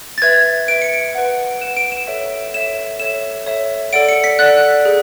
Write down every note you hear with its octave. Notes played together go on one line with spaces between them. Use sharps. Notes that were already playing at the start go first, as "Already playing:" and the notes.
A6
B4 E5 G#6
B4 E5 D7
C#7
D7
B4 F#5
B4 F#5 E7
D7
E7
A4 C#5 E5
A4 C#5 E5 E7
A4 C#5 E5 E7
A4 C#5 E5
A4 D5 F#5 D7
C#7
B6
A4 D5 F#5 F#6
G#4